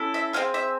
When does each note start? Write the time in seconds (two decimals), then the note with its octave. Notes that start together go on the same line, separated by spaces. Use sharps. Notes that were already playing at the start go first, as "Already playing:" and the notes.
Already playing: C#4 E4 A4
0.14 E5
0.33 C4 F4 G#4 F5
0.54 E5